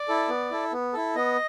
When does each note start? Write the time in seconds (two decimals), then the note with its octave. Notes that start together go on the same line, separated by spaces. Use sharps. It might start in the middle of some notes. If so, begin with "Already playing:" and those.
Already playing: D5
0.08 E4 A4
0.29 B3
0.51 E4 A4
0.73 B3
0.93 E4 A4
1.15 B3 D#5